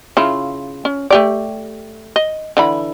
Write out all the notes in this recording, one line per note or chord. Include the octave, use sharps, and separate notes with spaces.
C#3 E4 F4
C#4
A3 G4 D5
D#5
D3 E3 B5